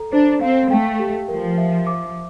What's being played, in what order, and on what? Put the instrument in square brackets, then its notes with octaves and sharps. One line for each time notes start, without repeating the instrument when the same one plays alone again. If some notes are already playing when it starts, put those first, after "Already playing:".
Already playing: [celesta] A4 A#5
[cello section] D4 [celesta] C5
[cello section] C4 [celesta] F5
[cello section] A3 [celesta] G5
[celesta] G4
[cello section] F3 [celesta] A#4
[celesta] E5
D6